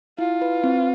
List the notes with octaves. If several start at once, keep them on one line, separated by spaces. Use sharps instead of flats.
E4 F4
B4
C4